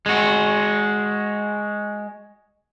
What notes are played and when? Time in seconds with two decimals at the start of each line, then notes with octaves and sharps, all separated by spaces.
0.06 G#3 F#4